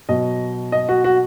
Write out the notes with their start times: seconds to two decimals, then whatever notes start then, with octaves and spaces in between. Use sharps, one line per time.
0.09 B2 F#3 D#5
0.72 D#5
0.89 F#4
1.04 F#4